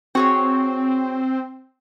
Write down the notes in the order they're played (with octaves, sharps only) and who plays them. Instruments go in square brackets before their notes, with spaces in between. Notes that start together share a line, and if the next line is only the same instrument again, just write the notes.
[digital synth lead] C4 [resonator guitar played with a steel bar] F#4 G#4 C#5